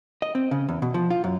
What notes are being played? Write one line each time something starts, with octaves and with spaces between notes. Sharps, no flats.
D#5
C4
C#3
E2
B2
F3
F4
F#2